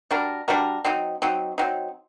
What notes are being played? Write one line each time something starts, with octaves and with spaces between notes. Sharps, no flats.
G3 D4 F#4 A#4
G3 D4 F#4 A#4
F#3 C4 D#4
F#3 C4 D#4
F#3 C4 D#4